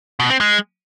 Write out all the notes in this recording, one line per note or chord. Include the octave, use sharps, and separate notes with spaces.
B2
C4
G#3